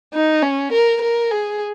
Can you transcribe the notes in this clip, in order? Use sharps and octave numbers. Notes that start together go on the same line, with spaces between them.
D#4
C#4
A#4
A#4
G#4